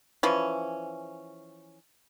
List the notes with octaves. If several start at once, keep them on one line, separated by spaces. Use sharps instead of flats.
E3 F3 C#4